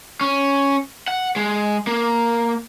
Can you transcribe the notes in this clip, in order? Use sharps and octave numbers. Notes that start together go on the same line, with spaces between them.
C#4
F#5
G#3
A#3